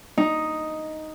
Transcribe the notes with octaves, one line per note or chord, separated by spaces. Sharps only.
D#4